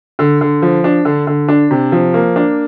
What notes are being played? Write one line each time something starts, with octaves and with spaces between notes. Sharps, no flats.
D3
D3
F3
D4
D3
D3
D4
C3
F3
A#3
D4